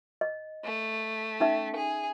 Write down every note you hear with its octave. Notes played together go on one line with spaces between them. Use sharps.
D#5
A3
C#4 D#4 E5
G#4